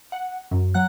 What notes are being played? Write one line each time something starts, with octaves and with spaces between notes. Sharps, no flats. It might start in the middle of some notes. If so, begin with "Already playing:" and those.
F#5
F#2
F#3 F#5 F#6